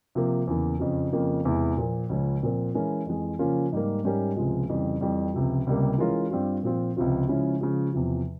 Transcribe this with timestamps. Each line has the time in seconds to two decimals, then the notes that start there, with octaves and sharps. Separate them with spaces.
0.15 C3 F3 A#3
0.47 E2 C#3 E3 A#3
0.80 F2 C#3 F3
1.12 F2 C#3 F3 A#3 F4
1.45 E2 C3 E3 G#3 E4
1.77 A#2 F3 A#3
2.09 C#2 C#3 F3 G#3 C#4
2.43 A#2 F3 C4 F4 A#4
2.74 E3 G#3 C#4 E4 A#4
3.06 F2 E3 G#3
3.39 C#3 F3 A#3 C#4 F4
3.72 G#2 G3 A#3
4.04 G#2 G3 C#4 G4 A#4
4.37 C#2 C3 F3 G#3
4.69 F2 C#3 E3 G3
5.01 F2 E3 G3
5.34 C#2 C3 F3
5.67 C#2 C3 G3 A#3
5.98 E3 G#3 C#4 F4 A#4
6.31 G2 G3 C4 F4
6.63 A#2 F3 C4 F4
6.97 C#2 C3 F3 C4 F4
7.28 C#3 F3 G#3 C#4 E4
7.60 C#3 F3 G#3
7.93 E2 C3 F3